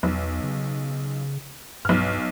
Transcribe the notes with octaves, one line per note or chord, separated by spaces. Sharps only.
B1 E2
C#3
B1 G2 F6